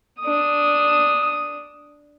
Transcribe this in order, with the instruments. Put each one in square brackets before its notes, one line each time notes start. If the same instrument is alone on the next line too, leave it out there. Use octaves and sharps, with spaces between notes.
[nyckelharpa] D4 D#6